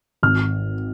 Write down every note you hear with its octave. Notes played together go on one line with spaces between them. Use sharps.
G#1 F6